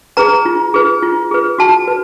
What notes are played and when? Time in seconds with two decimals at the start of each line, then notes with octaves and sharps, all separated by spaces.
0.17 G#4 B4 A#5
0.45 F4
0.74 G#4 B4
1.03 F4
1.31 G#4 B4
1.58 F#4 A5
1.88 B4